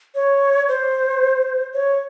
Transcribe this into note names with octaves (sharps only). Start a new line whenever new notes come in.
C#5
C5
C#5